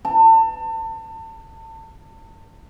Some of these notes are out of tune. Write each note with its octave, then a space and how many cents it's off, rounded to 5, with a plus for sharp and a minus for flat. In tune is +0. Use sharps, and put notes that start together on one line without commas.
A5 +30